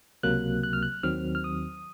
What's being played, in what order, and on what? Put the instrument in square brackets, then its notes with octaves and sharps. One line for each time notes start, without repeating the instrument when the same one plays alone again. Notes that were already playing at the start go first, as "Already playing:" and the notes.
[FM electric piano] C#2 C3 F#3 A#3 F#6
F#6
F6
F#6
D#2 D#3 F#3 C4 F6
F6
D#6